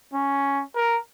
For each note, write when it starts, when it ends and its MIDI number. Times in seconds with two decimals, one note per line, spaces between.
0.14 0.63 61
0.76 0.98 70